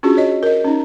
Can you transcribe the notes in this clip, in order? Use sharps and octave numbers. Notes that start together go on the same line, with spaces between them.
C#4 D4 F4 F#4 G#4
C#5 D#5
A#4 D#5
C#4 D#4